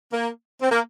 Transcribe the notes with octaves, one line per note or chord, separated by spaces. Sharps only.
A#3
C4
A#3